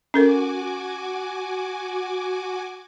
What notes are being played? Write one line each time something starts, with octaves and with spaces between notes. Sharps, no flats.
C#4 F#4 A4 A#4 G#5 D6